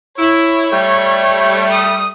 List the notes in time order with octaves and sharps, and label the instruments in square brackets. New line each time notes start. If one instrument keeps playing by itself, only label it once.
[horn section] E4 [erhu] C#5
[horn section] G3 A3
[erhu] D#6